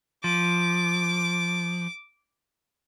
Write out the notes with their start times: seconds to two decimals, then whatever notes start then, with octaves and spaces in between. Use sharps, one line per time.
0.24 F3 D6